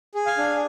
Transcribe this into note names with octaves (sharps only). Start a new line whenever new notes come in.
G#4
F5 G#5
D4